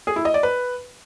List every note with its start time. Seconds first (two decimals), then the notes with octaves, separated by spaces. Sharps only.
0.07 G#4
0.16 E4
0.25 D#5
0.34 D5
0.43 B4